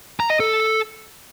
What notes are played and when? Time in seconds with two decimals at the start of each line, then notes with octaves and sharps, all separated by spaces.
0.20 A#5
0.30 D#5
0.40 A4